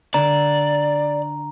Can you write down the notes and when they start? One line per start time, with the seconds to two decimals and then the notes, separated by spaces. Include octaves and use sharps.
0.14 D3 D5 A#5